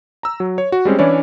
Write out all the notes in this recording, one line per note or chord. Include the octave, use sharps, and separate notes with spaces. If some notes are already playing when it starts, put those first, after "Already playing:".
A#5 E6
F#3
C#5
F#4
G3 G#3 C4 C#4
E3 C#4 D4 E4 C#5 D5